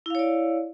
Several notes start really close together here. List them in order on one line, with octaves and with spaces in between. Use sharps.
E4 F5 C#5 D5